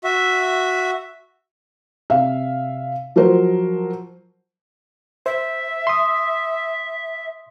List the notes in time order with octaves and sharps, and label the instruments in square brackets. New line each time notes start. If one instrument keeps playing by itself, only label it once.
[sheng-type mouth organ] F#4 E5
[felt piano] C3 E5 F5
F3 F#3 A#4 C5
[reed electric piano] C5 [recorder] E5
[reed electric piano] C6 D#6